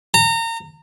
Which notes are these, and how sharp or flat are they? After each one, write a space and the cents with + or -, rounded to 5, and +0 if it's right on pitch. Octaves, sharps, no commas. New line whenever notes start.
A#5 -30